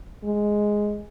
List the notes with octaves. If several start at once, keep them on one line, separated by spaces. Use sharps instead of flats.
G#3